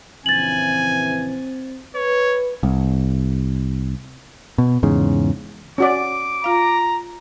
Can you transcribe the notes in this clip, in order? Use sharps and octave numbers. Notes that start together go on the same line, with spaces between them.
A#1 C#3 E3 C4 G#5 A6 F#7
B4 C#5
C2
B2
E2 G#2 C#3
C#4 F#4 D5 D6
F4 F5 A#5